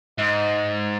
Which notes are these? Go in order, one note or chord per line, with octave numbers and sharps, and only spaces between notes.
G#2 D#5